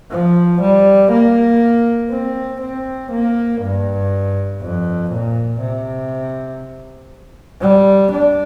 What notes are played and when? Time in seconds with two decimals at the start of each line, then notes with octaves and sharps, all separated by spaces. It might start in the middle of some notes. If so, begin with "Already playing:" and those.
0.11 F3
0.61 G3
1.11 A#3
2.11 C4
2.61 C4
3.11 A#3
3.61 G2
4.61 F2
5.11 A#2
5.61 C3
7.61 G3
8.11 D4